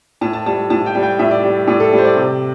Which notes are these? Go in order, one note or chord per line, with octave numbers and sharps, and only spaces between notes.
A2 A5
A5
G3 A5
A2 A5
G5
G3
G5
A2 E5
D5
G3
A2 D5
A4
G3
C5
D5
C3